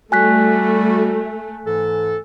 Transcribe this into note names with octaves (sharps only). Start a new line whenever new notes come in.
G3 A3 F#4 G#5 F#6 B6
G#2 E3 A4